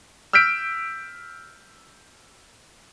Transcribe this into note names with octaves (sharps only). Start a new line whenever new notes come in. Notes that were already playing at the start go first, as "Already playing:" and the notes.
E6 F6 G6 B6 D7